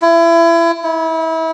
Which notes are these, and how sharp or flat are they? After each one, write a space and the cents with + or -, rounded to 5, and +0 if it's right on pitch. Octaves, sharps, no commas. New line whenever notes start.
E4 +30
E4 -30